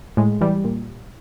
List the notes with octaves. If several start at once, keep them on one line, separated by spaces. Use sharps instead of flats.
A2 G#3
E3 G3
A#2